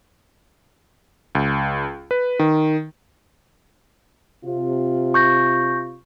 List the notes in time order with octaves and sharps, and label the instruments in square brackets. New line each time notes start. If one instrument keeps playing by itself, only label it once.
[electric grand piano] C#2
B4
D#3
[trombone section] C3 F4
[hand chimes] C#6 G6 A#6